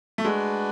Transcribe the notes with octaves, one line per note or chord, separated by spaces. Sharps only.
A3
G#3 D4 F#4 B4 D5